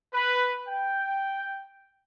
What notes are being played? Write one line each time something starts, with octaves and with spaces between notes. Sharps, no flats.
B4
G5